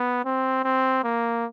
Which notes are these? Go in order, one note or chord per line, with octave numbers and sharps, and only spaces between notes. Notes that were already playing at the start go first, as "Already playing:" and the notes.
Already playing: B3
C4
C4
A#3